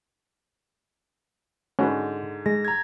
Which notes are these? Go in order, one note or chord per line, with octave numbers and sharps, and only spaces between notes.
G#2 D3 C#4 F#4 B4
G#3 A#6
A#5 G#6